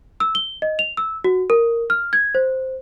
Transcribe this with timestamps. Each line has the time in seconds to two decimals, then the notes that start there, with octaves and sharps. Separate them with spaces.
0.20 E6
0.35 G7
0.62 D#5
0.79 F7
0.97 E6
1.24 F#4
1.50 A#4
1.90 F6
2.13 G#6
2.35 C5